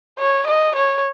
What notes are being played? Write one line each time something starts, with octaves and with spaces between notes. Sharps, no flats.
C#5
D#5
C#5